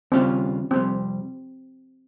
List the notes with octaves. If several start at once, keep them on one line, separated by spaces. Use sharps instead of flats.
D#2 C#3 G3 C4 C#4 F4
F2 C3 G3 C4